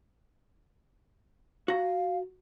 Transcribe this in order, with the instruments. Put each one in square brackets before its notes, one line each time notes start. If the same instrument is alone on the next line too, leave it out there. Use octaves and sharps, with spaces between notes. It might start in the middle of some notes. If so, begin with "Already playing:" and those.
[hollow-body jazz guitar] F#4 A#5 [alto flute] F5